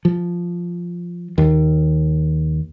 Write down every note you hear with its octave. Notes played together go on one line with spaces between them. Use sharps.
F3
D#2